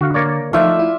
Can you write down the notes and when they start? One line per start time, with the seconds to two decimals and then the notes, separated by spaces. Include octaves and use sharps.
0.01 D3 F#4 F5
0.14 A#3 C#5 D5
0.53 F3 A3 D#4 F4 D5 E5 F5
0.79 E4